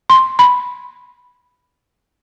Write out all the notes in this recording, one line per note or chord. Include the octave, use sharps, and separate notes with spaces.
C6
B5